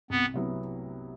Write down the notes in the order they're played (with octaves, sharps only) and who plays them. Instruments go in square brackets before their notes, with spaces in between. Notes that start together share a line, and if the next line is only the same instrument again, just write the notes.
[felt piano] C2 [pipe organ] B3
[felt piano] C3 F#3 B3 E4